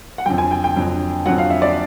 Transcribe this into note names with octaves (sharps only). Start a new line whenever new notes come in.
F#5
F2 D3 F#3 G5
G#5
G5
G5
F2 D3 F#3
F2 D3 F#3 F#5
F5
E5
D5